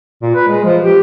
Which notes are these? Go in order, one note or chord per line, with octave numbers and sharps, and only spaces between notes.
A#2
B4
G#3
F3
G4